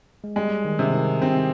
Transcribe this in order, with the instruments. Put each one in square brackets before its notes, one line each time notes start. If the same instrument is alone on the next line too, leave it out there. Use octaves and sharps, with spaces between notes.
[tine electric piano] G#3
[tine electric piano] G3 [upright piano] G#3
[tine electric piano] D#3
[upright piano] C3
[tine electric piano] D#3
[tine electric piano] C3 [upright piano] C4